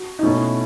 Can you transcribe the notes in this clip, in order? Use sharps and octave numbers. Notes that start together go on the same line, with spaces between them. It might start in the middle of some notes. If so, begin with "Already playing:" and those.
Already playing: F#4
D#4
B2 A3 C#4 E4